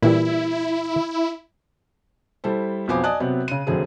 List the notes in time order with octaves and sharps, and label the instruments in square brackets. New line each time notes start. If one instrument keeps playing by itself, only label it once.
[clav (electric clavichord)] A#2 E3 G3 [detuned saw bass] E4
[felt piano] G3 E4 A4 C5
B1 F2 B3 C5 G#5 D6
D5 D#5 G#5 A5 D#6 F#6
C3 F#3 B3 C4
C#3 D#7
F1 F#2 D3 C4 G#4